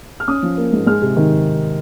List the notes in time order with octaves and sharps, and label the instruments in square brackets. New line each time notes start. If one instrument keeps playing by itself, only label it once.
[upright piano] F6
C#4 D#6
F3
A#3
G#2
G#3 F6
C3
D#3